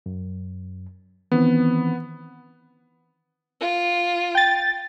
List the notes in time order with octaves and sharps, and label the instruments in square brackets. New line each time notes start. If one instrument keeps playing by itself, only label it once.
[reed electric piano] F#2
[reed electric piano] D#3 E3 C4 [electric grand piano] B3
[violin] F4
[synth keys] G5 A6